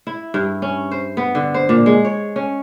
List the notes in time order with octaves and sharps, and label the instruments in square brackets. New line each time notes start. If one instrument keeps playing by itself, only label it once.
[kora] E4
G2
C#4
C5
B3
D3
C5
A#2
G#3
C#5
C#4